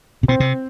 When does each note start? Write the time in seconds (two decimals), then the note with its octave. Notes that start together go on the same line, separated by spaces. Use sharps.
0.23 C3
0.28 B2 C4
0.40 C3